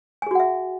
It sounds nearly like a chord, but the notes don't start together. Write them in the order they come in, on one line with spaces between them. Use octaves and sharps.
G#5 G#4 F#4 F#5 E5